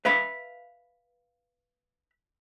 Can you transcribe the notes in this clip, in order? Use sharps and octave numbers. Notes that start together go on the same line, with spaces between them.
B4 E5 F5 B5